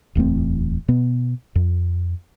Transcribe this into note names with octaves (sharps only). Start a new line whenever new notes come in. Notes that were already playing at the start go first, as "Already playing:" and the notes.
D1 E2 A3 C4
B2 B3
F2